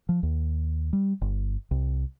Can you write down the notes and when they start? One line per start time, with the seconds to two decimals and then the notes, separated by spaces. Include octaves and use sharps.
0.09 F3
0.23 D#2
0.93 G3
1.21 G1
1.71 C2